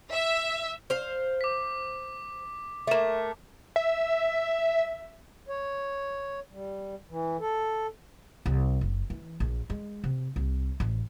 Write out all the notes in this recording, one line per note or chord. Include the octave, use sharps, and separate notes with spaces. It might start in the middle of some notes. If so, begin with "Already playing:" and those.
E5
C5 F5
D6 B6
A3 A#3 E5 E7
E5
C#5
G3
E3
A4
C2
F#1
E3
A#1
G#3
C3
C2
A1